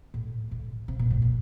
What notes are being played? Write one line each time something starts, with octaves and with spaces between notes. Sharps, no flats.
A2
A2
C3
A#2
A2
A#2